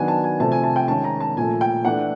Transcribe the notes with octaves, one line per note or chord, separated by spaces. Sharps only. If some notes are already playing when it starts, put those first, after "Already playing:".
Already playing: D#3 F#3 B3 D4 G#5
A5
G#5
C3 F3 A3 C4 A5
G#5
A5
G5
D#3 G#3 C#4 A5
A#5
A5
A#2 F3 A3 G#5
G5
E3 A3 D4 F#5